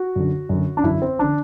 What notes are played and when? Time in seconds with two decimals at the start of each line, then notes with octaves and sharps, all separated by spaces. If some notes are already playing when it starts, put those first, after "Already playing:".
Already playing: F#4
0.16 F#2 D3
0.49 F#2 D3
0.77 D4
0.84 F#2 D3 E4
1.02 C4
1.19 D3 D4